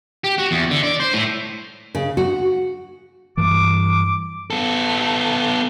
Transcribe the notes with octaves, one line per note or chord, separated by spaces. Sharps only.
G4
F#4
E2
D3
D5
C5
A2
C#3
F#4
G2 E3 D6
B3 A4